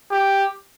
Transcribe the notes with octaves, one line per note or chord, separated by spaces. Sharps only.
G4